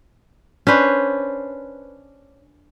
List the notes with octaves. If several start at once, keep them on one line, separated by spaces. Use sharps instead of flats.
C#4 D4 B4 C5